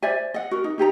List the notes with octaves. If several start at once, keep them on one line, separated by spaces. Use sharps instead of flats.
C5 D5 E5 G#5
D#5 F#5
F#4 A#4
D#4
D#4 G4 A4 A#5